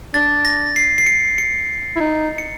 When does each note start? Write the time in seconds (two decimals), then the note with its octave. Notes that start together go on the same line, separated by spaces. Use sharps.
0.14 D4 A6
0.45 A#6
0.76 C7
0.98 C7
1.06 C#7
1.38 C#7
1.96 E4
2.00 D#4
2.38 C#7